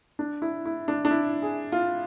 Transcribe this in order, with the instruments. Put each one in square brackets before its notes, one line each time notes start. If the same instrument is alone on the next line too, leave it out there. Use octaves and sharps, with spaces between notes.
[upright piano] D4
E4
E4
D4
D4
E4
G#4
F4